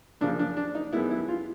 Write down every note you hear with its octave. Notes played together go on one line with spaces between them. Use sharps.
F#2 C#3 F3 A#3 D4
D4
D4
D#4
F#2 D#3 G#3 B3 E4
E4
F4